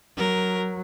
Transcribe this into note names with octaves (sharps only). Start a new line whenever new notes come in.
F#3 A#4